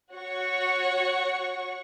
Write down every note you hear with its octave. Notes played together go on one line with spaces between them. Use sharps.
F#4 C#5 F#5 C#6